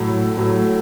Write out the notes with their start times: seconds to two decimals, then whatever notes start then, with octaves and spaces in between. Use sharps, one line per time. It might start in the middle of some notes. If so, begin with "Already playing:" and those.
Already playing: A2 F#3 A4
0.37 A2 F#3